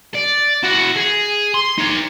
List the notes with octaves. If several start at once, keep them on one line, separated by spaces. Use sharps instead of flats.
D5
E4 F#4
G#4
C6
D#4 C#5